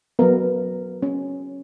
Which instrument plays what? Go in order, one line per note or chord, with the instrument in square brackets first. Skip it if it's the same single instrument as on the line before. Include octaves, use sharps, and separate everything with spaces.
[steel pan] F#3 B3 A#4
C#4